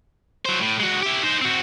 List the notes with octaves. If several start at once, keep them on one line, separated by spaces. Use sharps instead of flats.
F#3 C5
A2
G#3 F#4
E4 G4
D#4 C5
C4 F#4